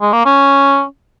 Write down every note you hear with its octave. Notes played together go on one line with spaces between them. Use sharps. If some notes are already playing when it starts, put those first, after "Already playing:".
G#3
A#3
C#4